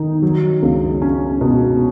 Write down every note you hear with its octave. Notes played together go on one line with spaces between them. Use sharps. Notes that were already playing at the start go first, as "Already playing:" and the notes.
Already playing: D#3 D#4
F#3
C#2
C#4
B2